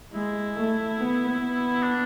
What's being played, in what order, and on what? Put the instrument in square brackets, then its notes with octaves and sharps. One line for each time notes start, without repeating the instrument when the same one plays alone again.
[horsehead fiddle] G#3 [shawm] E4
[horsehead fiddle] A3
B3
B3
[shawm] D4